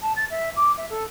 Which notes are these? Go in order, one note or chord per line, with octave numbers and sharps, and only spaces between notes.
A5
A6
E5
D6
E5
A4